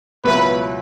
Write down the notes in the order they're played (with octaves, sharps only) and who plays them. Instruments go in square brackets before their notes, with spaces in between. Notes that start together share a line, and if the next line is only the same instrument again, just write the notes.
[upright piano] C#2 B2 F#3 B3 E4 [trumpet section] B4